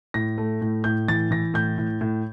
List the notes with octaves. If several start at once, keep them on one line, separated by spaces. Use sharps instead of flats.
A2 A#6
A3
A2
A2 G6
E3 A6
E3 A#6
A2 G6
A2
A2